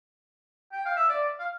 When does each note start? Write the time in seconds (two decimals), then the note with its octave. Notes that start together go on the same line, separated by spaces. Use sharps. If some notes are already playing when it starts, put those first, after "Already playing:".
0.72 G5
0.85 F5
0.97 E5
1.09 D5
1.39 F5